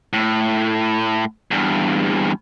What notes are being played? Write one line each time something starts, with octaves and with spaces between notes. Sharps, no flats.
A2
E2 G2